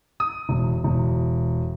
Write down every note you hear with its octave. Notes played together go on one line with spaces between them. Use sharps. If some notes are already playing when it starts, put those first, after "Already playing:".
D#6
E1
E1